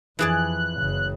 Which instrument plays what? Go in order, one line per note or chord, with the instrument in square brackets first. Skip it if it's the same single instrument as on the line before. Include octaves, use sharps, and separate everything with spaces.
[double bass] F2 [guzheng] E3 G#4 D5 [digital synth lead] F#6
[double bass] F#1 C#3